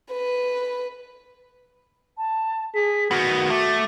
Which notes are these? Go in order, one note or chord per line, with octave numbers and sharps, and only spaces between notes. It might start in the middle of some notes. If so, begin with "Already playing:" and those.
B4
A5
G#4 B6
D#3 B3 F#4 A#6
A3 D6